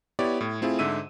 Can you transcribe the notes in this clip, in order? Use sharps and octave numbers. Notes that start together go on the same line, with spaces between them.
B3 E4 G4 C#5 D5
A2
A3 C4 E4 F4 G#4
G#2 D3 E5 E6 D#7